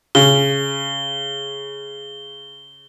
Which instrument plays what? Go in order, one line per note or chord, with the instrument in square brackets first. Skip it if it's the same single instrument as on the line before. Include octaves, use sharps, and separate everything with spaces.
[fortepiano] C#3 [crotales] G7